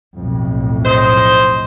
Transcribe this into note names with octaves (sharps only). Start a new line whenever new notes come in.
B1 F2 A2
C5 D#5